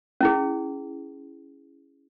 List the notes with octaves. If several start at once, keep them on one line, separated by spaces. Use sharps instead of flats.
C#4 E4 G#4